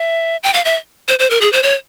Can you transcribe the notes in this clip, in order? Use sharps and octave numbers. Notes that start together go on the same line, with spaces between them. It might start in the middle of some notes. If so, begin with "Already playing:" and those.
Already playing: E5
G5
F5
E5
C5
C5
A#4
G#4
C5
C#5